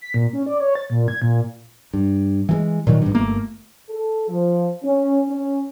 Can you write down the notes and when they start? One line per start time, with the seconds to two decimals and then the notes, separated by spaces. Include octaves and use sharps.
0.01 B6
0.14 A#2
0.33 C#4
0.46 D5
0.60 C#5
0.75 A6
0.90 A#2
1.08 G#6
1.22 A#2
1.94 G2
2.49 E3 F3 G#3
2.87 A#2 D#3 F#3
3.02 A1 G2
3.15 G1 A3 A#3
3.89 A4
4.28 F3
4.84 C#4
5.27 C#4